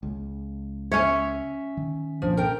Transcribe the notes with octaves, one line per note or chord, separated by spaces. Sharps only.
C#2
C#4 C#5 E5
D#3
C2 A#2 F3 D4
A#4 G5